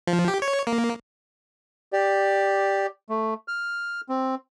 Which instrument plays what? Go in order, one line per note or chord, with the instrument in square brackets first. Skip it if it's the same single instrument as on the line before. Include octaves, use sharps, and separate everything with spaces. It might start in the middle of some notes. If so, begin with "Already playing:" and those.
[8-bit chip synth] F3
G4
C#5
A#3
[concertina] G4 D5
A3
F6
C4